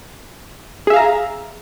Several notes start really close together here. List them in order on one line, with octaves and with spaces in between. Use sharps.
G#4 E5 F5 A#5